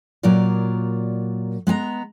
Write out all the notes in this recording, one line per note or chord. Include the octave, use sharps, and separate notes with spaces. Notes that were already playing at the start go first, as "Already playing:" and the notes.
A#2 F#3 F4 A#4 D5
G#3 B3 G#5 A#5